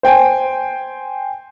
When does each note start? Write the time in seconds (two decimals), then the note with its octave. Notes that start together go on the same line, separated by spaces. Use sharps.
0.03 C5 G5 G#5